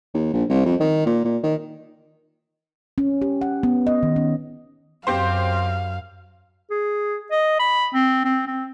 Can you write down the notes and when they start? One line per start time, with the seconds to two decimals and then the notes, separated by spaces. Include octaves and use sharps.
0.14 D#2
0.33 A#1
0.49 C2
0.65 F2
0.80 D#3
1.06 A#2
1.25 A#2
1.43 D#3
2.98 C#4
3.22 G4
3.41 F#5
3.63 B3
3.87 D#5
4.03 D#3
4.16 C#4
5.07 F#2 C4 G4 C5 F5
6.70 G#4
7.31 D#5
7.59 B5
7.94 C4
8.25 C4
8.47 C4